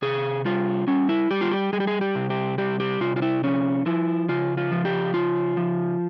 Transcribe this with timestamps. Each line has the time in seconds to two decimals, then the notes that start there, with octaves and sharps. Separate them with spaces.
0.02 C3 G#4
0.45 G3 F4
0.87 G3 C#4
1.09 E4
1.31 G3 G4
1.41 F4
1.51 G4
1.73 G3 G#4
1.80 G4
1.87 G#4
2.01 G4
2.15 C3
2.30 G4
2.58 G3 G4
2.80 G4
3.01 C3 F4
3.16 F4
3.22 E4
3.44 F3 C#4
3.86 F3 E4
4.29 C#3 F4
4.57 F4
4.71 F3
4.85 G4
5.14 C#3 F4
5.57 F3